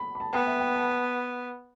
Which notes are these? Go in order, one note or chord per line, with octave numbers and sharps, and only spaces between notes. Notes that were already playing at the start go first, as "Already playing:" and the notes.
Already playing: B5
B5
A5
B3 G5
E5
G5
A5